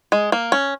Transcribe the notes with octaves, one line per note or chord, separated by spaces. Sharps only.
G#3
A#3
C#4